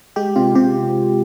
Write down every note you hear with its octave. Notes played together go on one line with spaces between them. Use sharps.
G#3 G4
C3 F4
C3 G4